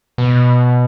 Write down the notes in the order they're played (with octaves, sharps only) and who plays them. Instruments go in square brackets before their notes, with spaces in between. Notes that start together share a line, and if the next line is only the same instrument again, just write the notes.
[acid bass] B2